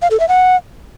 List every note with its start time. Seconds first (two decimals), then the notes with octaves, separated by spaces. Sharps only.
0.02 F5
0.11 A4
0.20 E5
0.29 F#5